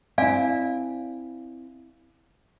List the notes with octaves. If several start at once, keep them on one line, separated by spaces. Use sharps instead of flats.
C4 E4 D5 F5 G#5